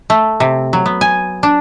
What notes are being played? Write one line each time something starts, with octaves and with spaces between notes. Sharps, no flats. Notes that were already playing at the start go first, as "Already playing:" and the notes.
A3
C3
F#3
B3
G#5
D4